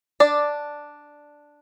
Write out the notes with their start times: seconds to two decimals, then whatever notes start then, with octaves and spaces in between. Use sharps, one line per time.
0.20 D4 D5